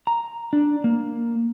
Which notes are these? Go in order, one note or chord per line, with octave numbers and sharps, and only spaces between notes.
A#5
D4
A#3